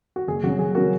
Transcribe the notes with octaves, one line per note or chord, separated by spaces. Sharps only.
F#4
F#1 G#4
F#2 C#3 F#3 F#4
F#1 G#4
C#3 F#3 F#4 A#4